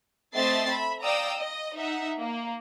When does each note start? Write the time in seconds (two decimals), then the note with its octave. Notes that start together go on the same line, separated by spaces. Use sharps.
0.35 A3 C4 D#5 E5 A6 C7
0.70 E5 B5
1.03 D5 F5 G5 A#5 D#6 E6
1.38 D#5
1.76 D#4 E5 F#5
2.19 A#3